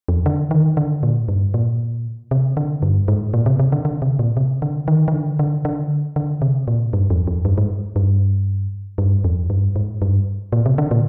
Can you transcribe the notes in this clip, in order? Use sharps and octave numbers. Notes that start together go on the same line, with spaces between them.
F2
D3
D#3
D3
A#2
G2
A#2
C3
D3
G2
G#2
A#2
C3
C3
D3
D3
C3
A#2
C3
D3
D#3
D#3
D3
D3
D3
D3
C3
A#2
G2
F2
F2
G2
G#2
G2
G2
F2
G2
G#2
G2
A#2
C3
D3
A#2